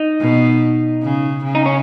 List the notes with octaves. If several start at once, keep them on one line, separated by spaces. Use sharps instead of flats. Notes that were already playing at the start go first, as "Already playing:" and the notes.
Already playing: D#4
B2
C#3
C#3
D#4
C#4